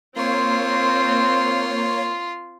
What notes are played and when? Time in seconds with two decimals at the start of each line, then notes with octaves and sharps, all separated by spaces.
0.16 A#3 C4 F4 C#5 C6